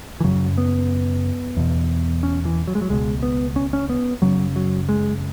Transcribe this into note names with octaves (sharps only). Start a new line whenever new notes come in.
E3
F#2 C#3 F#3
B3
E2 B2
C#4
E3
F#3
G#3
F#3
C#2 B2 G#3
B3
C#4
C#4
B3
F#2 C#3 F#3
F#3
G#3